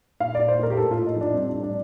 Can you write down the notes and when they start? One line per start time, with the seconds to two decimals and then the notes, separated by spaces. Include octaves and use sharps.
0.20 A#2 F5
0.35 A#2 D5
0.48 C5
0.59 A#2 A#4
0.70 G4
0.77 A2 A4
0.91 A2 F4
1.06 D#4
1.16 F3 D4
1.34 G3 C4
1.49 A2 D4
1.63 D4